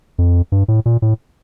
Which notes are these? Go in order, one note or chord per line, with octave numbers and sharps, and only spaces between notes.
F2
G2
A2
A#2
A2